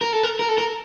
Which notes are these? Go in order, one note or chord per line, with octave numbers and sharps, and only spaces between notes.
A#4
A4
A#4
A#4
A4
A#4